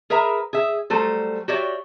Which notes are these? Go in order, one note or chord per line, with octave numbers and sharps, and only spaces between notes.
G#4 A#4 B4 E5 A#5
G#4 E5
F#3 G3 A3 A4 C5
F#4 G4 C#5 D5 E5